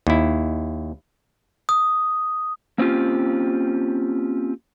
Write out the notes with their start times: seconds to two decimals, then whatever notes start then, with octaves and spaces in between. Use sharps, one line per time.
0.07 D#2 E4
1.69 D#6
2.78 A#3 C4 C#4 F4 G4